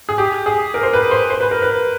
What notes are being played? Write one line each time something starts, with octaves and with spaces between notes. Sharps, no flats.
G#4
G4
G#4
A#4
C5
B4
C5
C5
B4
A#4
B4